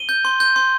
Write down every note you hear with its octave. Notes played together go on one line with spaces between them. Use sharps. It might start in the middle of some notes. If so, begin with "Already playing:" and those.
Already playing: D#7 G7
G6
C6
G6
C6